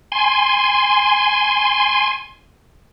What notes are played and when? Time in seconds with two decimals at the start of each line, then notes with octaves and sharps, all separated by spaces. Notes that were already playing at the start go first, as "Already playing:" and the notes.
0.12 G#5 C6